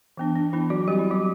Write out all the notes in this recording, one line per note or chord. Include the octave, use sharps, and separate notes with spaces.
E3 B3 D4
D4
E3 B3 D4 E4
F#3 F#4
F#3 G3 C4 G4
E4
F#3 F#4